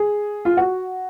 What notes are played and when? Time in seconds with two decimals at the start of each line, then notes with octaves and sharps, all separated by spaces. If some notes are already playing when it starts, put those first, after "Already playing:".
Already playing: G#4
0.45 F4
0.57 F#4